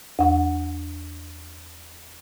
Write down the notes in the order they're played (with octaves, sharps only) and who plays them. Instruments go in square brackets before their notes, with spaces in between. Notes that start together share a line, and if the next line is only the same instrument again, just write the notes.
[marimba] E2 F#5